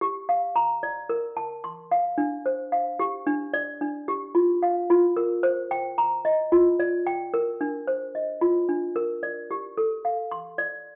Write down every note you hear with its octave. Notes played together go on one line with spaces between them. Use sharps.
G4
F5
A#5
D5
A#4
A5
C6
F5
D4
C5
F5
G4
D4
D5
D4
G4
F4
F5
F4
A#4
C5
G5
A#5
D#5
F4
D5
G5
A#4
D4
C5
D#5
F4
D4
A#4
D5
G4
A4
F5
C6
D5